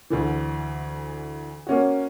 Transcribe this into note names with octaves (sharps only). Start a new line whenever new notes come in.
D2 D3 E3
A#3 C#4 F#4